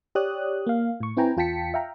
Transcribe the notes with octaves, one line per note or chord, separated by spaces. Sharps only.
G4 C#5 D5 D#6 F#6
A#3 F5
A2 C#6
C4 E4 B4 G5 G#5 A#5
E2 F4 G5 A5 B6 C#7
E5 F5 G5 A#5